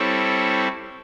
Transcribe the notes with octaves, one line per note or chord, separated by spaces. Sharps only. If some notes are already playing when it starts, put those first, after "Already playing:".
Already playing: G3 C4 E4 A4 C#5